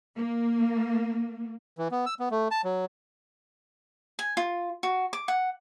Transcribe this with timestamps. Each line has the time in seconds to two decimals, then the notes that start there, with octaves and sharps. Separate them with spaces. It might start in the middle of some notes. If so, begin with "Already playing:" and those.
0.16 A#3
1.78 E3
1.91 B3
2.06 E6
2.20 B3
2.31 A3
2.51 A5
2.64 F#3
4.19 G#5
4.37 F4
4.83 F#4
5.13 D6
5.28 F#5